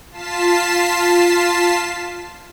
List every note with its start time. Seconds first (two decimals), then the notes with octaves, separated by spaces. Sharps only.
0.11 F4 A5 B6 C7 E7